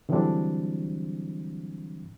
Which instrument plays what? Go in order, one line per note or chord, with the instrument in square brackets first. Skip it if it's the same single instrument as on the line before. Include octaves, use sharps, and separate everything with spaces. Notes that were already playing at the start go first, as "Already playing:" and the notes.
[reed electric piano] D3 E3 F#3 G3 C4 D4